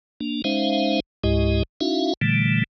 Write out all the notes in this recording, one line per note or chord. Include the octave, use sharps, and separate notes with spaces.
A#3 D4
G#3 C#4 D#4 C5 E5 F5
C#2 G#2 G#3 E4 G4 D#5
C#4 D#4 E4 F#4 E5 F5
A#2 D3 E3 G3 A3